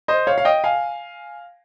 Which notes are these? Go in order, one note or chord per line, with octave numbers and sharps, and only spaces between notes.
C5 D#5
C#5 F5
F5
D#5 G5
F5 G#5